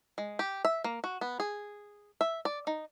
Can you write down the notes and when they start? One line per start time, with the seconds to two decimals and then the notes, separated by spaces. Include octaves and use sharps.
0.18 G#3
0.39 G4
0.65 E5
0.84 A#3
1.04 F#4
1.21 B3
1.40 G#4
2.21 E5
2.45 D5
2.67 D#4